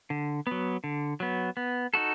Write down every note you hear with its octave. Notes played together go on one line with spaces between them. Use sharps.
D3
F#3 B3
D3
F#3 B3
B3
D#4 F#4 A4